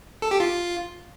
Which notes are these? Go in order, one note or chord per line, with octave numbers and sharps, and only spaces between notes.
A4
G4
F4